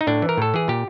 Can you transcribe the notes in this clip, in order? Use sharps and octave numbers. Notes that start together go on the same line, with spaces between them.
D#4
A2 D4
E3
A#4
A2 A4
E3 G#4
A#2 G4